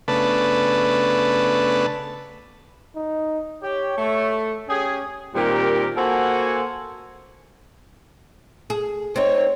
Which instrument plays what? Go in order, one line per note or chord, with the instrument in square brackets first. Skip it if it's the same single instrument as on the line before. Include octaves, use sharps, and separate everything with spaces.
[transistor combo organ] C#3 A3 B3 D4 B4 A5
[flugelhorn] D#4
[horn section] G4 [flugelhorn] C#5
[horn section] A3
[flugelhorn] C#4 [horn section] G4 G#4
[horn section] A#2 D#3 G3 C4 G4 A#4
A#3 F#4 A4 C5 F#5 G#5
[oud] G#4
[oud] C4 D#4 [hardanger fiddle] C#5